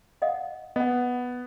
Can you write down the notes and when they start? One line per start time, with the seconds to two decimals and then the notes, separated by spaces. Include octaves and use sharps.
0.22 D#5 F5 F#5
0.76 B3 D#5 F#5